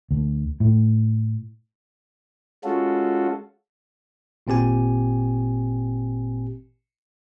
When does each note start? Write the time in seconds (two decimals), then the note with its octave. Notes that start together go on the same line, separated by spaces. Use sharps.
0.11 D2
0.60 A2
2.64 G#3 C#4 F4 F#4 A4
4.47 G#1 A#2 C4 G4 G#5